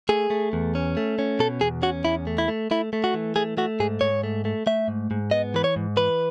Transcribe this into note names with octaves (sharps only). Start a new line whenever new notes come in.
A3 G#4
A3
E2
C#4
A3
C#4
B2 A4
E2 G#4
C#4 F#4
E2 E4
A3
E4
A3
A3 E4
A3
F#4
E3
A3 G#4
A3 F#4
G#2 G#4
G#2 C#5
A3
A3
A3 E5
G#2
G#2
B3 D#5
E3 B4
C#5
G#2
E3 B4